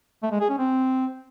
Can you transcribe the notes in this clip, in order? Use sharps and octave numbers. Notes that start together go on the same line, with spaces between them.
A3
G#3
G#4
C#4
C4